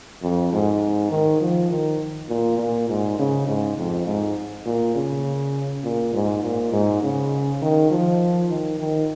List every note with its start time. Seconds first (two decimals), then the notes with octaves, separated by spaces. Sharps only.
0.22 F2
0.53 G#2
1.11 D#3
1.41 F3
1.70 D#3
2.29 A#2
2.59 A#2
2.89 G#2
3.19 C#3
3.47 G#2
3.78 F2
4.07 G#2
4.66 A#2
4.95 C#3
5.84 A#2
6.14 G#2
6.43 A#2
6.72 G#2
7.03 C#3
7.62 D#3
7.91 F3
8.50 D#3
8.80 D#3